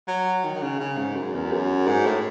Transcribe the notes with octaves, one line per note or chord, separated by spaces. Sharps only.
F#3
D#3
D#3
C#3
C#3
G#2
F#2
E2
F#2
G#2
A2